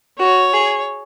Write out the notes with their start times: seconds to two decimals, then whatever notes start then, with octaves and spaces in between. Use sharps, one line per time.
0.19 F#4 C#5
0.54 G#4